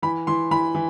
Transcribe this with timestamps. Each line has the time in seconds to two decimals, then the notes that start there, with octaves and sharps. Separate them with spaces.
0.02 E3 B5
0.27 E3 C6
0.51 E3 B5
0.75 E3